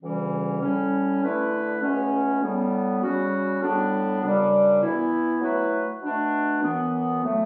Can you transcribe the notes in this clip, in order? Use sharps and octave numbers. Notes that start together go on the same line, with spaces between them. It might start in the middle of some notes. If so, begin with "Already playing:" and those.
D2 C#3 E3 G3 C#4
A2 G3 C#4
D3 A3 E4 B4
C#2 B2 A3 C#4
A2 G3 B3
C#3 G3 C#4 F#4
A2 G3 B3 D4
F#2 C#3 G3 D4
E3 B3 E4
F#3 A3 E4 B4
B2 A3 D4
F#2 E3 B3
A2 F#3 A3